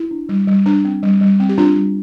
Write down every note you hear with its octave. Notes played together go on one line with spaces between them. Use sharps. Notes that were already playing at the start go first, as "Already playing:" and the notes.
Already playing: E4
D4
G3
G3
D4
C4
G3
G3
C4
G4
C4 D4 F4
G3